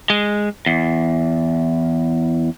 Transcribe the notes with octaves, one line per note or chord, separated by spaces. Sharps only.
G#3
E2